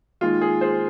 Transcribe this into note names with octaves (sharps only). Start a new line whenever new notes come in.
D#2 D#3 G#3 F4
G#4
G#4 C5